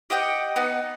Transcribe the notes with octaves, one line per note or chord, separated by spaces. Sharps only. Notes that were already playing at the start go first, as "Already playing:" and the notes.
G4 D#5 F#5 G5
B3 D#4 F#5